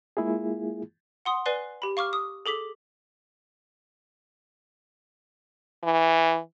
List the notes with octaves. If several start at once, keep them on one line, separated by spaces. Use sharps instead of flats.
G#3 A#3 E4 F4 G#4
F#5 C6 D#6
B4 D5 G#5 F#6 C7 G7
G4 B5
F5 C#6 D6 F6
D#6
G#4 A4 D6 B6
E3